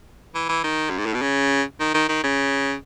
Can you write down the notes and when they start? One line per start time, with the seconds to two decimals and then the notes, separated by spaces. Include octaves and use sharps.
0.35 E3
0.49 E3
0.64 D#3
0.90 F#2
0.98 G#2
1.06 A2
1.14 B2
1.22 C#3
1.80 D#3
1.94 D#3
2.09 D#3
2.24 C#3